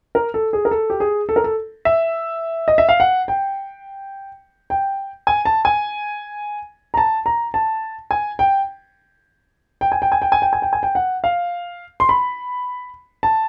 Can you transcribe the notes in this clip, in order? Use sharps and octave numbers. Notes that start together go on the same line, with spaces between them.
A#4
A4
G#4
A#4
A4
G4
G#4
A4
A#4
A4
E5
D#5
E5
F5
F#5
G5
G5
G#5
A5
G#5
A#5
A5
A#5
A5
G#5
G5
G5
G#5
G5
G#5
G5
G#5
G5
G#5
G5
G#5
G5
F#5
F5
C6
B5
A5